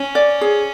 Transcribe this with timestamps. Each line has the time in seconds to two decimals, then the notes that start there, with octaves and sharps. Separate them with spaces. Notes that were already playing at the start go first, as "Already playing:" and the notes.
Already playing: C#4
0.15 D5
0.41 G#4